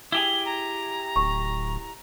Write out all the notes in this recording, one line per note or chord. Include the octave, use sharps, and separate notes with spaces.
E4 G4 G#4 G7
A#5
D1 C#6